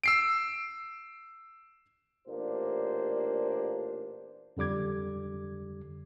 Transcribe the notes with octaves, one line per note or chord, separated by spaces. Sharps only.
E6 C7 D7
A1 A#2 A#3 D4 G4 C5
F2 D3 G3 D6 G#6